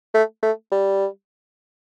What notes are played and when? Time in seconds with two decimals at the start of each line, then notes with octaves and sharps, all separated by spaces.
0.14 A3
0.43 A3
0.72 G3